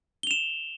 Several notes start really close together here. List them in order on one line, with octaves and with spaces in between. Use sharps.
G7 F7 E7